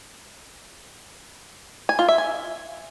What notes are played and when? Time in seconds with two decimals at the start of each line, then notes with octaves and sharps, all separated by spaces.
1.89 G#5
1.99 F4
2.09 E5
2.18 G#5